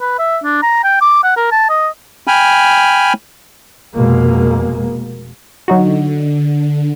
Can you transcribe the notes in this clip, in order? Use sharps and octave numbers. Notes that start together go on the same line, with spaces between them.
B4
E5
D4
A#5
G5
D6
F#5
A#4
A5
D#5
G5 G#5 B5 F6
F1 B2 G#3 A#3
D3 F#3 D#4 F#4